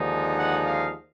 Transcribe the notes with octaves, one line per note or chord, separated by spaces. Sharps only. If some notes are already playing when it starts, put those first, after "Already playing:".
Already playing: D#2 D3 F3 G#3 D#4
F#5
F5